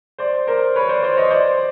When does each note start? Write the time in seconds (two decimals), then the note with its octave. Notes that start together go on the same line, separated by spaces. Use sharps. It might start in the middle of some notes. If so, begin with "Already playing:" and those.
0.18 C5 D5
0.47 A#4 C5
0.76 B4 C#5
0.89 C5 D5
1.03 C5 D5
1.17 C#5 D#5
1.31 C5 D5